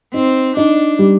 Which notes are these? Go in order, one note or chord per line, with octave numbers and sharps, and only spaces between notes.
C4 D#4
D4 D#4
G3